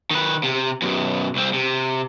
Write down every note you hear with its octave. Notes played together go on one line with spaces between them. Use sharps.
D#3 B4
C3
F#2 B2
C2 C4
C3